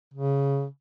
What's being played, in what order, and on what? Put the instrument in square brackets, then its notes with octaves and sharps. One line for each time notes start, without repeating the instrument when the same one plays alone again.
[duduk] C#3